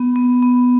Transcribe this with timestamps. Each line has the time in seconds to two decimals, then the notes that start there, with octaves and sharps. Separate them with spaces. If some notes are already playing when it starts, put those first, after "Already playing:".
Already playing: B3
0.16 B3
0.43 B3